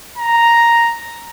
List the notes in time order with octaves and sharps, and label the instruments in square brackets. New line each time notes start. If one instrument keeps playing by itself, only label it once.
[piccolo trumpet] A#5